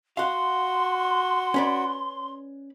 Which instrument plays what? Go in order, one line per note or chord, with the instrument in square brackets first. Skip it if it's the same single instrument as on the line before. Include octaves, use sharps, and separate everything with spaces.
[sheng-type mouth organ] F#4 [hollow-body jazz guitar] F5 F#5 [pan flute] C6
[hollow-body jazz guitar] C#4 B4 D5